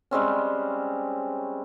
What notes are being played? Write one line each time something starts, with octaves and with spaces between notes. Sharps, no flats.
G3 G#3 C4 C#4